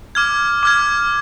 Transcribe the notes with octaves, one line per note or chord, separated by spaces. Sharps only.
D6 F6 G#6
D6 F6 G#6